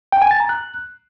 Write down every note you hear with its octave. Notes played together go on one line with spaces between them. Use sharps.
G5
G#5
A6
A#5
F#6